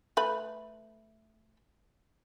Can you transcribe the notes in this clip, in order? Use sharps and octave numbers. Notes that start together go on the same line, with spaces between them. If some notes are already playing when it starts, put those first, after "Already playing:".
A3 B4 B5